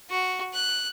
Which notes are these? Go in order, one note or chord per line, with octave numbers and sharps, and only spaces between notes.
F#4
F#6